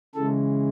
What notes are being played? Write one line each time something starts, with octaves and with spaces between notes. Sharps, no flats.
C#3 E3 G#3 A4